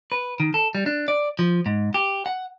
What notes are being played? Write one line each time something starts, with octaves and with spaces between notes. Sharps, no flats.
B4
D#3
A4
G3
D4
D5
F3
G#2
G4
F#5